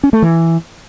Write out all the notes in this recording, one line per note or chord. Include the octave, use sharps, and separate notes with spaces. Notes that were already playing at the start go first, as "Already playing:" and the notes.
C#4
A3
E3